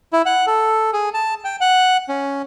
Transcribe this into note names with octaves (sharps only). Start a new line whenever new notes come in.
E4
F#5
A4
G#4
A5
G5
F#5
C#4